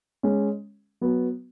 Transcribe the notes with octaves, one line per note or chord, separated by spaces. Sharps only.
G#3 C#4
F#3 B3